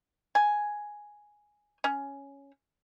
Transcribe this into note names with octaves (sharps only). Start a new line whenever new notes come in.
G#5
C#4